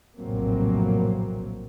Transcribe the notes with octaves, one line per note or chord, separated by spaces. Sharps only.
F1 A#1 A2 F#3 A#3 C4